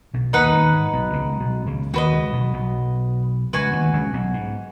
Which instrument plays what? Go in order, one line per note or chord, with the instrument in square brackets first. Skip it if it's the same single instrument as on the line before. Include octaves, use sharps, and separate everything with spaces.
[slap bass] B1 B2
[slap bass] D#2 D#3 [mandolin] D#4 B4 F#5
[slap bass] D#2 D#3
G#2
B1 B2
C#2 C#3
B1 B2
C#2 C#3
[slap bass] D#2 D#3 [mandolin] F#4 B4 D#5
[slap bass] C#2 C#3
B1 B2
B1 B2
[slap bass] C#2 C#3 [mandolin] F#4 B4 G#5
[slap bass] D#2 D#3
C#2 C#3
B1 B2
G#2